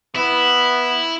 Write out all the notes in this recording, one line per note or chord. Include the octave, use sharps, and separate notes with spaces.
B3 E4